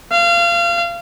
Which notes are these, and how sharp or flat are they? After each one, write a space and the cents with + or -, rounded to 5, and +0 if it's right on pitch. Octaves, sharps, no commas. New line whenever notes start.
F5 -30